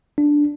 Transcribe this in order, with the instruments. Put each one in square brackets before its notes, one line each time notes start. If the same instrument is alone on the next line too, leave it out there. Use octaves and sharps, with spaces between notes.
[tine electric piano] D4